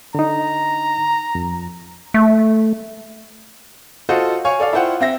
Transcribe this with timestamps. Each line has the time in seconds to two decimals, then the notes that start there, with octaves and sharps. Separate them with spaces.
0.15 D3 D#4 A#5
1.35 F2
2.14 A3
4.09 F4 F#4 A4 C5 D#5
4.45 C#5 F5 G#5 C#6
4.60 A4 D5 F5
4.73 E4 F4 C5 F#5 G5
5.01 C4 E5 A#6